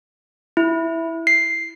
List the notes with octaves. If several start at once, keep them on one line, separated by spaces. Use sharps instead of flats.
E4
C7